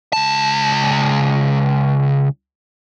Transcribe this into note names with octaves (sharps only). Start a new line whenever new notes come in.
C#2 A5